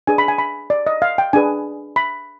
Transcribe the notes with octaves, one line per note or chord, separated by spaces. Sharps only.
D4 G#4 B4 G#5
B5
G#5
B5
D5
D#5
F5
G5
D4 G#4 B4 G#5
B5